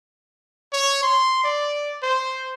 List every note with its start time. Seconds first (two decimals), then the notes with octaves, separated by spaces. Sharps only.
0.73 C#5
1.03 C6
1.44 D5
2.03 C5